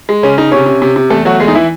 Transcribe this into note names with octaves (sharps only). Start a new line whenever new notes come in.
G#3
C#3 C#4
C#3 D#4
C3 C#4 C#5
C3
C3
C3
E2 A3 A4
F#3 A3 F#4
E2 G#3 G#4
D#4
E3 E4